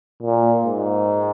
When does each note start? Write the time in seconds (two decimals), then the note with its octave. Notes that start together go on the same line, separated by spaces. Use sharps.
0.23 A#2
0.64 G#2